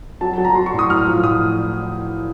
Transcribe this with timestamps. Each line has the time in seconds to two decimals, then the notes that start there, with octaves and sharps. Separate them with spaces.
0.21 F#3 A5
0.33 A5
0.38 F#3
0.45 A#5
0.55 F#3 C6
0.66 C#6
0.73 A2
0.79 D#6
0.90 A2 F6
1.07 F3
1.23 A2 D#6